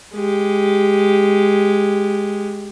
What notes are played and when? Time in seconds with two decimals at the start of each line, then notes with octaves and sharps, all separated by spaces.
0.14 G#3 G4